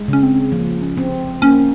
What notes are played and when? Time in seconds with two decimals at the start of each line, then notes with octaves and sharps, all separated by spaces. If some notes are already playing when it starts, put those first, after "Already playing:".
Already playing: G#3
0.08 C#3 C#4
0.23 C4
0.52 F3 A#3
0.82 C#4
0.98 C4
1.42 A#3 C#4